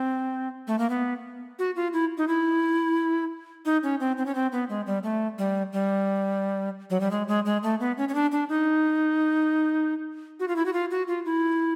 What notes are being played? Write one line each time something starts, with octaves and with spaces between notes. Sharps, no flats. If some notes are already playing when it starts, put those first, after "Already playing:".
Already playing: C4
A3
A#3
B3
F#4
F4
E4
D#4
E4
D#4
C#4
C4
C4
C#4
C4
B3
G#3
G3
A3
G3
G3
F#3
G3
G#3
G#3
G#3
A3
B3
C#4
C#4
D4
D4
D#4
F#4
F4
E4
F#4
F4
F#4
F4
E4